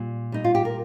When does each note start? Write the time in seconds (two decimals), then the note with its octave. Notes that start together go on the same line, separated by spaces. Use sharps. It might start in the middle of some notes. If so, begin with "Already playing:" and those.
Already playing: A#2 G3
0.32 G3 D#4
0.44 F4
0.55 G4
0.65 A#4